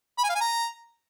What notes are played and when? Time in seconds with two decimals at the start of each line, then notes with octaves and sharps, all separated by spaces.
0.18 B5
0.24 G#5
0.30 F5
0.35 G#5
0.41 A#5